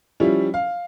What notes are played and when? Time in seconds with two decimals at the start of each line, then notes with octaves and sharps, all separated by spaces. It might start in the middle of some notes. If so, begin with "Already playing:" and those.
0.20 F3 G3 C#4 E4
0.54 F5